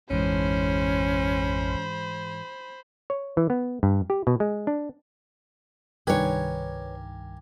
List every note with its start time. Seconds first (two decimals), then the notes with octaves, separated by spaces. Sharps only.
0.10 A1 F2 G#2 E3 G#3 C#4 C5 B5
3.10 C#5
3.37 E3
3.50 B3
3.83 G2
4.10 G4
4.27 B2
4.40 G#3
4.67 D4
6.07 C2 G2 D#3 G4 A#4 B4 C#5 G#5